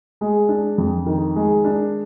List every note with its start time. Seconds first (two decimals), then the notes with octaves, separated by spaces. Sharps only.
0.21 G#3
0.49 D4
0.78 F2
1.06 D#3
1.36 G#3
1.65 D4